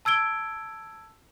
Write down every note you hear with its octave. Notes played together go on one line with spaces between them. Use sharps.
A5 E6 G#6 D7 G7